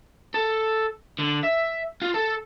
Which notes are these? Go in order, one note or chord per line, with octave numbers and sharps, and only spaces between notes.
A4
D3
E5
F4
A4